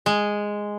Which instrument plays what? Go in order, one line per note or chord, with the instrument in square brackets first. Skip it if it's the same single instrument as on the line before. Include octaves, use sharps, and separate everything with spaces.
[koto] G#3